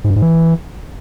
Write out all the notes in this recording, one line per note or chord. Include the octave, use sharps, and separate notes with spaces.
G#2
G2
G#2
E3